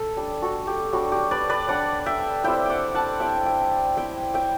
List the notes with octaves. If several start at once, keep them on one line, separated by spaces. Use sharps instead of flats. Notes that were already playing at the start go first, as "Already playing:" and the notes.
Already playing: A4
G3 D4
F#4 A4
G4
G3 D4 F#4
G4
B4 D5
B4 D5
G3 D4 D5 F#5
E5 G5
G3 C4 E4 E5 G5
D5 F#5 G5
F#5 A5
G3 C4 E4 E5 G5
E5 G5
G3 C4 E4 E5 G5
E5 G5